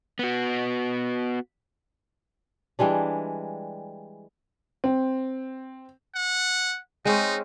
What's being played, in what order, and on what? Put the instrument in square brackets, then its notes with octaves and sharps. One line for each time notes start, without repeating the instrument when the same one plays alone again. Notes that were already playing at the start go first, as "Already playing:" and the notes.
[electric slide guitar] B3 F#4
[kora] E3 G3 G#3 D4
[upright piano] C4
[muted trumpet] F#5
[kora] G#3 C4 C#4 [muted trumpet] D#4